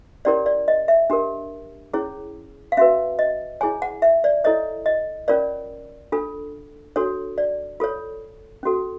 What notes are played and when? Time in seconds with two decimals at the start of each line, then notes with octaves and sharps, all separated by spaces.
0.25 C#4 E4 G4 A#4 C#5 D5
0.46 D5
0.68 D#5
0.88 E5
1.10 D4 G4 A#4
1.93 C#4 E4 G#4 C#5
2.72 F5
2.77 C#4 F#4 B4 E5
3.19 D#5
3.61 E4 G#4 C#5 G#5
3.82 F#5
4.02 E5
4.24 D5
4.44 E4 A4 C#5 D#5
4.86 D#5
5.28 C#4 F4 A#4 C#5 D5
6.12 D4 F4 A4
6.96 D4 F#4 A4 C#5
7.38 D5
7.80 F4 A4 C#5
8.63 C#4 F#4 A4